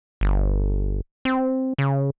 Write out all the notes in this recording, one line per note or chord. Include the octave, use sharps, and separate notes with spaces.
G1
C4
C#3